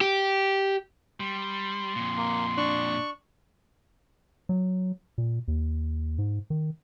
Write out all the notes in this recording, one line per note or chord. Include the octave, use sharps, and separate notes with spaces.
G4
G3 C6
F2 A#2
A#3
D4 C#6
F#3
A#2
D#2
G#2
D#3